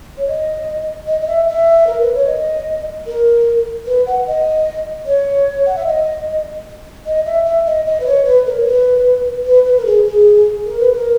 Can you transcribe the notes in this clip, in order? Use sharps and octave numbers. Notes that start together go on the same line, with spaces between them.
C#5
D#5
D#5
D#5
E5
E5
A#4
B4
C#5
D#5
A#4
B4
F#5
D#5
C#5
F#5
E5
D#5
D#5
E5
E5
D#5
D#5
B4
C#5
B4
A#4
C#5
B4
B4
B4
A#4
G#4
G#4
A#4
B4
A#4